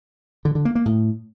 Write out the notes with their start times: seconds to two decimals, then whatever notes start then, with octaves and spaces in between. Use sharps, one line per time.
0.45 D3
0.55 D3
0.65 A#3
0.75 A#3
0.86 A2